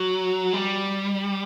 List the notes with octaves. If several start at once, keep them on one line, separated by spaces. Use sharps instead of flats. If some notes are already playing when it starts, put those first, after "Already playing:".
Already playing: F#3
G3